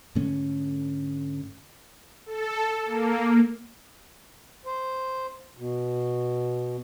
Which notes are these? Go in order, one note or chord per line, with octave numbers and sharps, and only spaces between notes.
G#2 D3 A3 C#4
A4
A#3
C5
B2